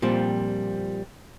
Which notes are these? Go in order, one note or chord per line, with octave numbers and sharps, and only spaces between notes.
A#2 F3 G3 C4